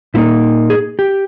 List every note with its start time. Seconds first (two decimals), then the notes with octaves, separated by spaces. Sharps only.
0.14 A#2 A#3 D#4 E4
0.70 G#4
0.99 G4